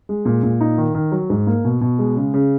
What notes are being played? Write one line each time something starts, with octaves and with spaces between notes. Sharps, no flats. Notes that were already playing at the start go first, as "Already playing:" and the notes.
G#3
A#2
A#2
D#4
D#3
D#3
F#3
G#2
A#3
B2
B2
G#3
C#3
C#3